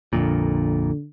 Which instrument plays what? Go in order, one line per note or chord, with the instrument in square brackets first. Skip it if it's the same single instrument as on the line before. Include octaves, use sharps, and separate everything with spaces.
[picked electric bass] A#1 F2 A#2 [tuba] D3